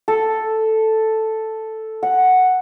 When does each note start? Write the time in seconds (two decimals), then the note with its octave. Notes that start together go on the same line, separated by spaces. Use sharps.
0.08 A4
2.03 F#5